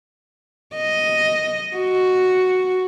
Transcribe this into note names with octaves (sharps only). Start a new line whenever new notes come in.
D#5
F#4